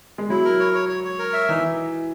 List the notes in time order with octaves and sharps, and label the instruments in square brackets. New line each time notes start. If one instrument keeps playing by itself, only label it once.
[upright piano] G#3
[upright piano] F#3 [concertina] E4
[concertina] A#4
C#5
C#5
C#5
C#5
A#4
E5
[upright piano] E3 [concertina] D#4